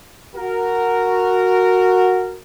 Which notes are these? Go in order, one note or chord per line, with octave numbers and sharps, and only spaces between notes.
F#4 A#4